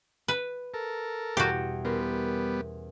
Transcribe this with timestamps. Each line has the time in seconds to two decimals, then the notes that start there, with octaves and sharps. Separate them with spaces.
0.28 B4
0.74 A4 A#4
1.37 E2 B2 G3 F#4 G4
1.85 G3 B3 C#4 A#4 C5